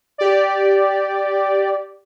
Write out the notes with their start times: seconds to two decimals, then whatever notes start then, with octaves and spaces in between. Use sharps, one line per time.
0.18 G4 D5